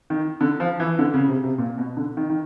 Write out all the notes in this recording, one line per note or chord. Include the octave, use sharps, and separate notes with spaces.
D#3
D3
F3
E3
D3
C#3
C3
C3
A#2
B2
D3
D#3
D#3